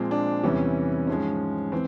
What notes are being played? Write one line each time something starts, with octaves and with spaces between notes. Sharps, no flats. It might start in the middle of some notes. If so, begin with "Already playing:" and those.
Already playing: A#2 F3 G#3 C4
D4
E2 C3 E3 G3 C#4
G#2 F3 G#3 C#4
E3 C4